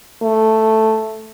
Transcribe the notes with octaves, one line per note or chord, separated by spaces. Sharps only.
A3